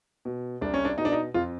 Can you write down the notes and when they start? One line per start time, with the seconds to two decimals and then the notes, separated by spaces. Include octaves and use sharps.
0.25 B2
0.61 C2 D4
0.74 C#4
0.85 D4
0.98 B2 D#4
1.05 D4
1.12 D#4
1.34 F2 F4